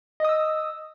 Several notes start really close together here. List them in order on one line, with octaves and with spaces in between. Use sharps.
D#5 D#6 E6